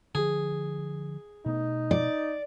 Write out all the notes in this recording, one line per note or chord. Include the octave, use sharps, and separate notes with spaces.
D3 F3 G#4
B2 A3 B3 D#4
D5